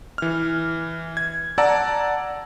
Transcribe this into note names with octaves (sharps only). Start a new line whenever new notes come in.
E3 F6
G#6
D5 F#5 A5 A#5 E6